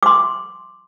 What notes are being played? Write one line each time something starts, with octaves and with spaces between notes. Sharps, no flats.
C6 D6